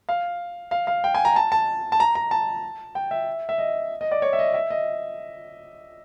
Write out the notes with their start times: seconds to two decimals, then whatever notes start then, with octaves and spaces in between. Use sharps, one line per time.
0.09 F5
0.71 F5
0.87 F5
1.04 G5
1.15 G#5
1.25 A#5
1.36 A5
1.52 A5
1.92 A5
2.00 A#5
2.15 A#5
2.31 A5
2.95 G5
3.11 E5
3.49 E5
3.58 D#5
4.01 D#5
4.12 D5
4.22 C#5
4.33 E5
4.39 D#5
4.54 E5
4.71 D#5